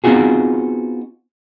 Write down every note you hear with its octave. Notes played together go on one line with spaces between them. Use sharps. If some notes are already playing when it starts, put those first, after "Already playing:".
B3 C4 D#4 F4 F#4 G#4